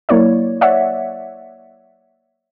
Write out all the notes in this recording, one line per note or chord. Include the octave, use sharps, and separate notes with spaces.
F#3 A#3 E4 C#5 D5
C#5 D5 E5 F#5